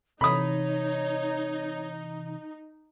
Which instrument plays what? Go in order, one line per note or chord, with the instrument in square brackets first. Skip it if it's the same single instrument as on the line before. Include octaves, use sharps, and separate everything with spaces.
[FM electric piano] C3 E3 [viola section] D#4 [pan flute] C#5 [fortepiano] B5 D#6